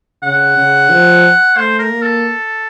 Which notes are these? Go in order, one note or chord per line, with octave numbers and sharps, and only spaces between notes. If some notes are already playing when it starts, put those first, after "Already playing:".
C#3 F#5
C#3
F3
A3 C5
A#4
A#3
A4